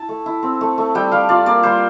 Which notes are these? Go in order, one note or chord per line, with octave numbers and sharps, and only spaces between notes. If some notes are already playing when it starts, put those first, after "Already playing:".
Already playing: E4 A5
A3
E4
C4
A3
A3
G3 G5
G3 F5
F4 D5
A#3 D5
G3 C5